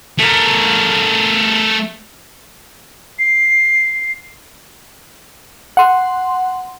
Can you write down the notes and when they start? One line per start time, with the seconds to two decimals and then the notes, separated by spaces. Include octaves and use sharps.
0.18 A3 A#4
3.19 C7
5.77 F#5 C6